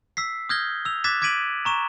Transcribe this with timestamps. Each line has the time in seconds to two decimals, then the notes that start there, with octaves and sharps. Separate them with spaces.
0.17 E6 B6 C7
0.49 D#6 F6 G6 G#6 A#6 G7
0.85 E6 F7
1.04 D6 F#6 G#6 A6 B6 E7
1.22 D6 G#6 B6 D7 D#7 F#7
1.65 A#5 C#6 E7